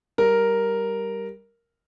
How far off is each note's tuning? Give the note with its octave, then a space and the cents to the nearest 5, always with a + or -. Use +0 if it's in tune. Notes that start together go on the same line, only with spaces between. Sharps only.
G3 +0 A#4 +0